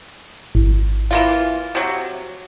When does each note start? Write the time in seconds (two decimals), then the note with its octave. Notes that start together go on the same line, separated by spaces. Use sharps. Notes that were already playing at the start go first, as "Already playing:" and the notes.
0.55 G#1
1.11 E3 A#3 F4
1.75 C3 F#3